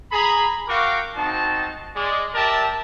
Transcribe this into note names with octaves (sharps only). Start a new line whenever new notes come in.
G#4 A#5 B5
F#4 A#4 F5 G5 C#6 D6
C4 D#4 F#4 A5
G#3 D5
G4 A#4 D5 E5 A5